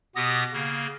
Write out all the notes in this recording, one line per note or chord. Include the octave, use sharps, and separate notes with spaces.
B2 B3 G4 D#6 A#6
C#3 A#3